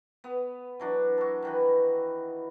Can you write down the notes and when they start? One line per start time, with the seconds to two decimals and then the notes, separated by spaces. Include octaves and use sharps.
0.24 B3
0.80 E3 F#3 D4
1.18 F#4 A4
1.42 D#3 E3 B4